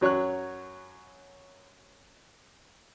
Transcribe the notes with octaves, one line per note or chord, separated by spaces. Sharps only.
F#2 F#3 C#5 C#6 F#6